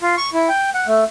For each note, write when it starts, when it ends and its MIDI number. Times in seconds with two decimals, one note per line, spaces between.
0.02 0.16 65
0.17 0.30 85
0.33 0.49 64
0.49 0.70 79
0.74 0.87 78
0.87 1.04 57